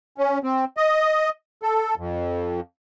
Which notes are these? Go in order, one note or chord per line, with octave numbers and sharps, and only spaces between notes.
C#4
C4
D#5
A4
F2